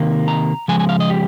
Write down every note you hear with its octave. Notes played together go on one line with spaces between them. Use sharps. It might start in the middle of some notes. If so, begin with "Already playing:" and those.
Already playing: C3 D#3 A#3
A#5
C#3 F3 G#3 G#5
G#5
F5
D#5
G4